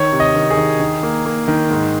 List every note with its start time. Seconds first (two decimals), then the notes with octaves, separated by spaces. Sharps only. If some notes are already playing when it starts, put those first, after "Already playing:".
Already playing: D#3 C#5
0.12 C3
0.20 D#5
0.35 D#3
0.50 G#4
0.57 D#3
0.80 D#3
1.03 A#3
1.26 A#3
1.48 D#3
1.70 G#2